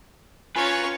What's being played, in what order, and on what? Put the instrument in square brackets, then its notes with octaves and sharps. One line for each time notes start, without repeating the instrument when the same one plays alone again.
[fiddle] C#4 C#5 [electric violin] F4 A#5 [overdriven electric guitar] B4 [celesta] G#5